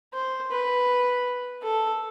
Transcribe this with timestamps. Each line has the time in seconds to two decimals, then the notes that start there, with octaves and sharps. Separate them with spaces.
0.14 C5
0.50 B4
1.63 A4